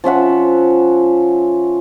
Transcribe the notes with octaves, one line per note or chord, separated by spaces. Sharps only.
F3 C#4 E5 F#5